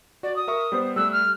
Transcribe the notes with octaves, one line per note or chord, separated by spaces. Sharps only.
F#4 D5
D#6
A#4 E5 C#6
G3 B3 C5
G3 A3 E6 F#6
F6